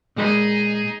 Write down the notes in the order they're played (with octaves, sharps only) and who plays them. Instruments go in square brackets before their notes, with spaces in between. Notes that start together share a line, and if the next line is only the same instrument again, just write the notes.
[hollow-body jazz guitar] A#2 G#3 B5 [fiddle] D#4 G#4